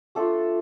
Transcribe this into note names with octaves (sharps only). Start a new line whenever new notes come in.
A3 D4 F4 A4